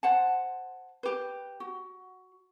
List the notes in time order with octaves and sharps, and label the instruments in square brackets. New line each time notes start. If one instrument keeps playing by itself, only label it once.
[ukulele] C5 F#5 A5
G4 B4
F#4